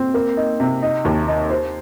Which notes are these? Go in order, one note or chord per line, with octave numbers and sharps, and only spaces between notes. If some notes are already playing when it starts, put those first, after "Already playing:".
Already playing: C4
A#3
D#4
C3
D#4
D#2
D#4
C5